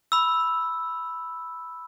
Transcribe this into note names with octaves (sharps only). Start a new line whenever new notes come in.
B5 E6